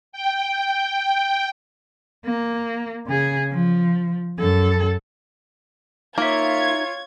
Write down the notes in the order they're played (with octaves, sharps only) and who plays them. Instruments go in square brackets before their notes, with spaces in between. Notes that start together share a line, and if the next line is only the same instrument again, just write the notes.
[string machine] G5
[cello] A#3
C#3 G#4
F3
F#2 A4
[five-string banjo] A#3 [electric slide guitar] D#4 E5 [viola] F4 C#5 [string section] G#6